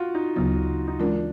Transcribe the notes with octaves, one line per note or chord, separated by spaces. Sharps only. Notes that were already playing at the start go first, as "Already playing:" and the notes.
Already playing: F4 F#4
D#4
D2 C#3 F#3 B3 D#4
D#4
E3 G#3 C#4 D4 F4 A#4